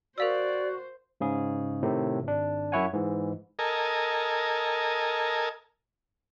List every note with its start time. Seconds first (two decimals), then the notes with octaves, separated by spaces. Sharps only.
0.18 F#4 A#4 C5 D5 F5 E6
1.21 G#2 C#3 G#4
1.83 A2 C3 D#3
2.24 G#1 D4
2.72 F#2 E4 C#5 F#5 G#5
2.93 G#2 E3
3.59 A4 A#4 D#5 G#5